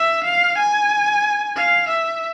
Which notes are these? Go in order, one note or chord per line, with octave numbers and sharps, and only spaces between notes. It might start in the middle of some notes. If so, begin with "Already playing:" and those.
Already playing: E5
F5
G#5
F5
E5